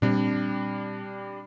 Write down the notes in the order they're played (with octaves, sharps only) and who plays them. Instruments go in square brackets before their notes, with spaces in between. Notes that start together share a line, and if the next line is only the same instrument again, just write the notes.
[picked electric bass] A#2 C4 [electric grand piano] G3 D4